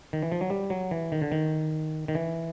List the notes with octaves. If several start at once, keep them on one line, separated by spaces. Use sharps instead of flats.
D#3
E3
F3
F#3
G3
F#3
E3
D#3
D3
D#3
D#3
E3